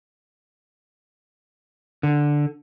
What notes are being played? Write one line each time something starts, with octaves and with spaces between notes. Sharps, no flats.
D3